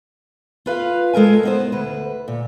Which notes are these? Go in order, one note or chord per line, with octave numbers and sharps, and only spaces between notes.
F4 B4 F5
G#3 A4 A#4 G#5
B3 D#4 C5
D2 B4
A#2